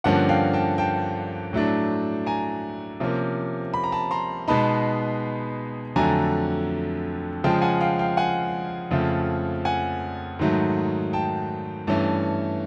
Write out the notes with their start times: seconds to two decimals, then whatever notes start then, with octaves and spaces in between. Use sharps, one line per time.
0.04 G2 D3 F3 A#3 C#4 F#5
0.29 F5 G5
0.53 G5 A5
0.78 G5 A5
1.53 A2 F#3 A3 D4
2.26 G#5 A#5
3.00 C3 F3 A#3 C#4
3.74 B5
3.84 A#5
3.92 A5 B5
4.11 A#5 C6
4.48 B2 G#3 B3 D#4 A5 B5
5.96 F2 D3 F#3 A3 G#5 A#5
7.44 C#3 F3 G#3 G5 A5
7.62 F#5 G#5
7.81 F5 G5
7.99 F5 G5
8.17 F#5 G#5
8.91 F2 C#3 F3 A3
9.65 F#5 G#5
10.39 G#2 D#3 F#3 A3
11.13 G5 A5
11.87 G2 E3 A3 C#4